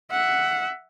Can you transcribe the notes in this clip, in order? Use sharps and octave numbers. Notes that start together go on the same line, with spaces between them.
E5 F#5